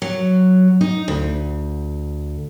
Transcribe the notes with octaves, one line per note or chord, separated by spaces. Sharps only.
F#3
D#4
D2